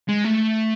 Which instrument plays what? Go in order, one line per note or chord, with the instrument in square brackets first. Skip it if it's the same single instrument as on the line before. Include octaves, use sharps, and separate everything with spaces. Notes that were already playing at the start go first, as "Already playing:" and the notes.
[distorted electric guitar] G#3
A3